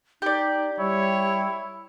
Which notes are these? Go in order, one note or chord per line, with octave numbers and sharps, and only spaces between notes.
D#4 G4 D5
G3 E4 C#5